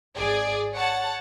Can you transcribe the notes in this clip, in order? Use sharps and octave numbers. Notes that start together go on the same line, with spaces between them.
G#1 G#4 D5
C#5 F#5 A5